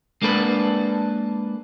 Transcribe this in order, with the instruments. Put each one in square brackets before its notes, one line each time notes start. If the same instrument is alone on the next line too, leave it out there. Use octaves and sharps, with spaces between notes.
[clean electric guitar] G#3 A#3 D4 A4 B4